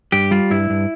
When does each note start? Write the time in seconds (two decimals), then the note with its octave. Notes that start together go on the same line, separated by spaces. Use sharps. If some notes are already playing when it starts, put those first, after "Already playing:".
0.12 G2 G4
0.31 G3 F4
0.51 G2 E4
0.70 G2